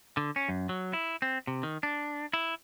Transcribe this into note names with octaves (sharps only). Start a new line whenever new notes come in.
D3
C#4
F#2
F#3
E4
C4
C3
D#3
D4
E4